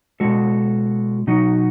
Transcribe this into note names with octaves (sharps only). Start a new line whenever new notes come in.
B2 G#3 F#4 A4
B2 F#3 D#4 F#4